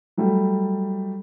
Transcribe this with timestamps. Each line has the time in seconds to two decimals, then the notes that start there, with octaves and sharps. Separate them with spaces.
0.18 F#3 G3 A3